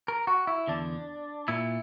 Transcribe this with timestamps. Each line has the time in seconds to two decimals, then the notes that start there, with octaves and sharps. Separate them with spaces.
0.08 A#4
0.27 F#4
0.47 E4
0.67 E2 D3 D4
1.48 A#2 E4